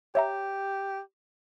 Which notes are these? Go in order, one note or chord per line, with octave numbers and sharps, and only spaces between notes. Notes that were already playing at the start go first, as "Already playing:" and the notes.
G4 C#5 E5 A#5